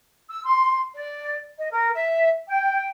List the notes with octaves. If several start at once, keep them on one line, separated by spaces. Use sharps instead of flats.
E6
C6
D5
D#5
A#4
E5
G5